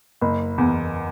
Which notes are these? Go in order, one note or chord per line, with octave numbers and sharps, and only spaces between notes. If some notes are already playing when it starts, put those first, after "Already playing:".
F#1
E2